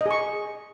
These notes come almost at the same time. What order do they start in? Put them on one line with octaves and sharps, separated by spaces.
D#5 G#4 C#6